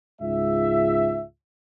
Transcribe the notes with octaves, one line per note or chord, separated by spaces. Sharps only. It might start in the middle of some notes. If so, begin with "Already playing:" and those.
C#2 G#2 G#3 F4 E5